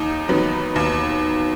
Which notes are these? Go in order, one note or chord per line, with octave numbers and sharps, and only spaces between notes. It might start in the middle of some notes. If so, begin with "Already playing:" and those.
Already playing: D#2 D#4
D#3 F#3 B3
D#2